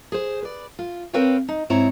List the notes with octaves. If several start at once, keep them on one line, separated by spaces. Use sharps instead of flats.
G#4 C5
B4 D5
F4
C4 A#4 B4 C#5 F5 G5
D#4
G#2 C4 E4 C#5 A#5